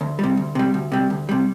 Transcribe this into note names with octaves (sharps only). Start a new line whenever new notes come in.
D2
C3 G3
D2
C3 G3
D2
C3 G3
D2
C3 G3